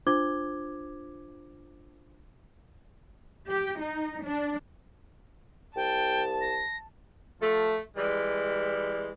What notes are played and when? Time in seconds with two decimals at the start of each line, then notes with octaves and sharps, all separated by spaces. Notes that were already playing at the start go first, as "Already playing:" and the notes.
0.07 D4 F4 C5 D6 G#6 G7
3.50 G4
3.81 D#4
4.24 D4
5.76 C2 G5 A5
6.41 A#6
7.41 F3 A3
7.96 E3 G3 G#3